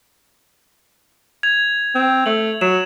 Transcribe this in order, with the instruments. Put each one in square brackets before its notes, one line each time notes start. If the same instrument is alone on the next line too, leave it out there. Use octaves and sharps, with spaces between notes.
[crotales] G#6 F7
[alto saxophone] C4
[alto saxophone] A3 [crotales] F#7
[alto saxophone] F#3 [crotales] E7